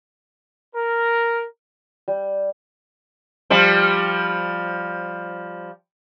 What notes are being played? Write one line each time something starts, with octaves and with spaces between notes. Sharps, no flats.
A#4
G3
F3 G3